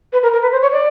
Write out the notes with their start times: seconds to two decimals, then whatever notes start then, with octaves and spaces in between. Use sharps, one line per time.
0.13 B4
0.23 A#4
0.33 A#4
0.42 B4
0.52 C5
0.62 C#5
0.72 D5